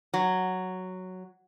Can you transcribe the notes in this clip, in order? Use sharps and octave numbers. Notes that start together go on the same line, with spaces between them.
F#3